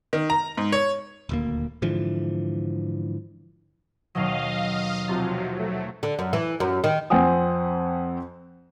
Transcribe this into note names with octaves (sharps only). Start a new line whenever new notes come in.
D#3
A#5
G#2
C#5
D#1 D2 A#3
G#2 D3 E3 F3
D#2 B2 F#3 D#5 F5
C3 F3 F#3 A6
F#3 A3
D3
F#2
E3
F#2
D#3
F2 C4 F#5 G#5 D#6